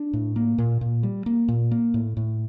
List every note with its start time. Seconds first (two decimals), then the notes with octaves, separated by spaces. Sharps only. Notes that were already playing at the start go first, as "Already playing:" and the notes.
Already playing: D4
0.13 A2
0.36 A#3
0.58 A#2
0.81 A#2
1.03 G3
1.26 A#3
1.48 A#2
1.71 A#3
1.94 A2
2.17 A2